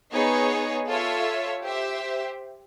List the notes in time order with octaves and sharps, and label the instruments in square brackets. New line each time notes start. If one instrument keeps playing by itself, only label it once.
[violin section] B3 D#4 G#4 C#5
F4 A4 C#5 E5
G4 C5 E5